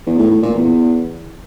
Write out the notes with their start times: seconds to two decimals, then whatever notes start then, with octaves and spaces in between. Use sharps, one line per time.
0.06 E2
0.18 A2
0.30 A2
0.42 A#2
0.54 E2